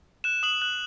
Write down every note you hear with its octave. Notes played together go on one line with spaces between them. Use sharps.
F#6 E7
D#6 F#7
F#6 F#7